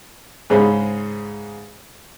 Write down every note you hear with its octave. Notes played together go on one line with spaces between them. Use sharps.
G#2 C#3 G#3 C#4 C5 B5